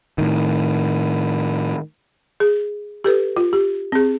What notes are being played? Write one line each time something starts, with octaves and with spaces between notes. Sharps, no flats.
A2 D#3
G#4
G4 A4 B4
F4
G4
C4 G#4